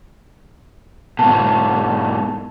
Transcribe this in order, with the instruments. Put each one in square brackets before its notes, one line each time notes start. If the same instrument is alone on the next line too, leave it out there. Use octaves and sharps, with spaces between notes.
[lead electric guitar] G#2 B2 [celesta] A5